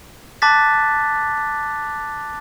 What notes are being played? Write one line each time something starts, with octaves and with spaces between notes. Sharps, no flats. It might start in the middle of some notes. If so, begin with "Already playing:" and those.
A5 D6 F#6 A6 B6